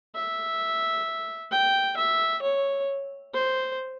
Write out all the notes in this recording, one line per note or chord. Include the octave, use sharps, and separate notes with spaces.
E5
G5
E5
C#5
C5